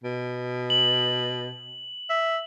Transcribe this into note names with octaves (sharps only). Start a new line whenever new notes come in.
B2
F#7
E5